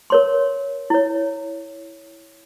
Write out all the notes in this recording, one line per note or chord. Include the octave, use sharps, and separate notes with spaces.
A#4 C#5 C6
E4 C#5